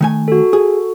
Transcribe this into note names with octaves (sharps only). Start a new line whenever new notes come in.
D#3 A3 G#5
F#4 A4
G#4